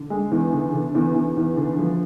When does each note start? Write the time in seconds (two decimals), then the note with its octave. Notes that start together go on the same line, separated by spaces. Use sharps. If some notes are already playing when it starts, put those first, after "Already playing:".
Already playing: D3
0.10 G#3
0.31 E2
0.53 D3
0.74 D3
0.95 E2
1.15 E2
1.37 E2
1.57 D3
1.79 F3